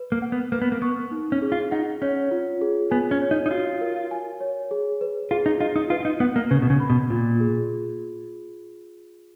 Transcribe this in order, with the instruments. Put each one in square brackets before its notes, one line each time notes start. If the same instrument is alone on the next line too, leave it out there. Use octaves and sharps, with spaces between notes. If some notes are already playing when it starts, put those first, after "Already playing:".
Already playing: [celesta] B4
[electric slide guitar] A#3
[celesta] F#5
[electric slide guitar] B3
[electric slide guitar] A#3 [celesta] B4
[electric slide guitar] B3
A#3
[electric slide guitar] B3 [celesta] C#6
[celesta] D#4
[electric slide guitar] C#4
[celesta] G#4
[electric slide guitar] F4
[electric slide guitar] D#4 [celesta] F#5
[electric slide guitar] C#4 [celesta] C#5
[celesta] F4
G#4
[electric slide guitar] B3 [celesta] G#5
[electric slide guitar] C#4
[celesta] C#5
[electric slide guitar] D#4
D#4
[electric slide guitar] F4 [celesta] F#4
[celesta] A#4
G#5
C#5
G#4
B4
[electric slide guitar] F4 [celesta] G#4
[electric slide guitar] D#4
[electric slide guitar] F4 [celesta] D#5
[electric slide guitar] D#4
[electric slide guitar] F4 [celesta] B4
[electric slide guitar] F4
D#4
[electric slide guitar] B3 [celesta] F#5
[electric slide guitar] A#3
[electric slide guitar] C#3 [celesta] B4
[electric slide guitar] B2
C#3
[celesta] B5
[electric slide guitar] B2
[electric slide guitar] A#2 [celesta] F4
[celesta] G#4